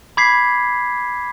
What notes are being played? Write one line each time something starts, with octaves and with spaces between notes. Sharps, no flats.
B5 D6 G#6 B6 C7